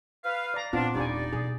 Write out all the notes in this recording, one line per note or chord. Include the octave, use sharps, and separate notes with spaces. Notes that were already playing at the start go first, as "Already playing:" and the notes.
B4 F5
D5 A#5
A#2 B3 C4 D4 F4
D#1 G3 D4 D#4 D5 G#5
B2 G#4